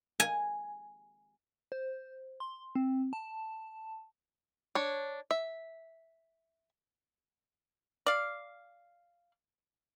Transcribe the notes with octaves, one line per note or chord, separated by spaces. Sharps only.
G#5
C5
C6
C4
A5
D4 C#5
E5
D5 F5